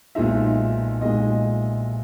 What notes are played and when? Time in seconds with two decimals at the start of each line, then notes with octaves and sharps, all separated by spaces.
0.15 B1 A#2 G#3 D#4 E5
1.01 B1 A#2 G#3 D#4 D#5